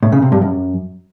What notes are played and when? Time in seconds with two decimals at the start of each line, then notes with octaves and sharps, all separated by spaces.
0.03 A2
0.12 C#3
0.22 C3
0.32 G2
0.42 F#2